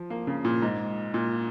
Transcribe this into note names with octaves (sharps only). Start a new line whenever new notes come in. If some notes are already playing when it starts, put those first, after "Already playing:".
Already playing: F3
A#3
C#3
A#2
G#2
A#2